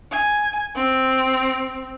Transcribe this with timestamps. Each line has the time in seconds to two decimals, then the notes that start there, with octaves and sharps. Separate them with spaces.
0.11 G#5
0.75 C4